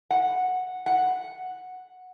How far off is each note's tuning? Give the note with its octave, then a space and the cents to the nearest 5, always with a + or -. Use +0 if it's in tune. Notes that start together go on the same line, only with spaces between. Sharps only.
F#5 -10
F#5 -5